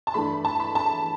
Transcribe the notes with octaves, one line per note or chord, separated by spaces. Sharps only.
A5
G2 E3 A3 D4 B5
A5
B5
A5